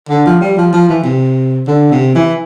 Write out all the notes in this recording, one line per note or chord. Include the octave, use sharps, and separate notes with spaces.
D3
F3
G3
F3
F3
E3
C3
D3
C3
E3